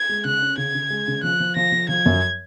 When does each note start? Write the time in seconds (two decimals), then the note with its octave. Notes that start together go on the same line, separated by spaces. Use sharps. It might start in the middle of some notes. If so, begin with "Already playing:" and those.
Already playing: G#6
0.09 G#3
0.25 C#3 F#6
0.42 C#4
0.58 C#3 G#6
0.75 C#3
0.90 G#3
1.08 C#3
1.24 F3 F#6
1.40 F3
1.56 F3 A#6
1.72 F3
1.89 F3 G#6
2.06 F#2